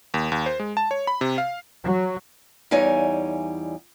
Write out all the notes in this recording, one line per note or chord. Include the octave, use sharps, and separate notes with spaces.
D#2
D#2
C5
G#3
A5
C#5
B5
C3
F5
F#3
E2 E3 G3 D#4 C#5 G#5